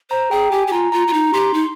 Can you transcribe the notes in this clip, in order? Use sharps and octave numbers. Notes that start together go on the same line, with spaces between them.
C5 A#5
G#4 G5
G4 G#5
G4
F4 A#5
F4 A#5
F4
D#4 A#5
G4 C6
D#4